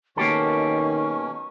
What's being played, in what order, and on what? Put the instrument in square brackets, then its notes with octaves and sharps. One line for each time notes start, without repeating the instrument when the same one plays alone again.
[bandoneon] B2 F#3 C#4 [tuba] D#3 [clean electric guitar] A#3 G4 A4 [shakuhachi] C#6